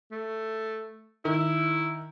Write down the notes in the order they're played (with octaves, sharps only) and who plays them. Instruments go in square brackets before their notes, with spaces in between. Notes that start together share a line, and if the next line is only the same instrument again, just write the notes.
[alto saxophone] A3
[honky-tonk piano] D#3 [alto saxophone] E4